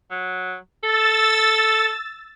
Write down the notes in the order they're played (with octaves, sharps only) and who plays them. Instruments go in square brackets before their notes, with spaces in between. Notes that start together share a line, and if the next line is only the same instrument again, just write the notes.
[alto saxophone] F#3
[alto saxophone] A4 [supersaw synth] E6 A6